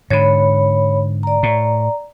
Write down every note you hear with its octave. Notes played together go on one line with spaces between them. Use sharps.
G#2 D3 C#5 B5
D5 A#5
A2